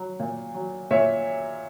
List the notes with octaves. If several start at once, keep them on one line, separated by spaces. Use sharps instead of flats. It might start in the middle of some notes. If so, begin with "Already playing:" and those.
Already playing: F#3
A#2
F#3
A#2 C#5 E5